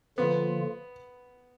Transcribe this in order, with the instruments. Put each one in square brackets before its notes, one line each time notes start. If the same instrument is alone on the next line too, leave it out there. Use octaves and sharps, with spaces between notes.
[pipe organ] D3 F3 A#3 F4 [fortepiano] B3